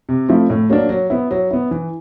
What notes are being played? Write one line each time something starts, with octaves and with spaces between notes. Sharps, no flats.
C3
F3 A3 C4 E4
A2
F#3 A#3 D4
F#3
B3 E4
F#3
B3 E4
E3